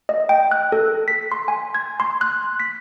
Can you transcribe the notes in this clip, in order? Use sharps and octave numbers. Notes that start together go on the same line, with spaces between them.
D#5
G5
F#6
A4
B6
C6
G#5
G#6
C6
F#6
B6